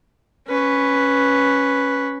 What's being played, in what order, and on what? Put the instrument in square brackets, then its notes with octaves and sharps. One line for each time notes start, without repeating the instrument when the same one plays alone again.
[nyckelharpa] C#4 B4